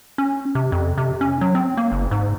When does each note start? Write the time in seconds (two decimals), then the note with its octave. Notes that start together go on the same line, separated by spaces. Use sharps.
0.18 C#4
0.55 C3
0.72 F2
0.98 C3
1.21 C#4
1.41 F#3
1.55 C4
1.77 A#3
1.92 F#1
2.11 G#2